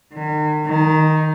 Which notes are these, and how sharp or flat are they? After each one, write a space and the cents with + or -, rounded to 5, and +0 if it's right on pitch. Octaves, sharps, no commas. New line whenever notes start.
D#3 -40
D#3 +5